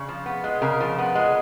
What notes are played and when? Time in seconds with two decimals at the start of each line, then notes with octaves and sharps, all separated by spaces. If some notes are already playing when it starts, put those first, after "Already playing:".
Already playing: C#3
0.08 F3
0.26 B3
0.44 G#3
0.62 C#3 A#4
0.80 F3
0.98 B3
1.15 G#3